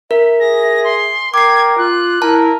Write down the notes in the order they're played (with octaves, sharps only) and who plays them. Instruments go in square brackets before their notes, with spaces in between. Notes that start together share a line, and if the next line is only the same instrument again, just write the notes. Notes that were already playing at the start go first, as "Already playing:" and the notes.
[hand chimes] A#4 [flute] E5
[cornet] G#4 [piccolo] A#6
[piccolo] C6
[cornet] A#4 [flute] G5 [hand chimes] D6 C7 [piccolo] G#6
[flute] F4 [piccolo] F#6
[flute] E4 [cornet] A#4 [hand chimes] A5